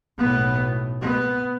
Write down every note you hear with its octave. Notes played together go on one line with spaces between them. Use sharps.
B1 A2 B3
B3